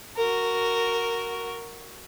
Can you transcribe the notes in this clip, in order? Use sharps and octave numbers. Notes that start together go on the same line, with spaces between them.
F#4 A#4